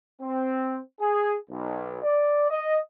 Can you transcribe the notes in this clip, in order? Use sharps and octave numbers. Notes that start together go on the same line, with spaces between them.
C4
G#4
B1
D5
D#5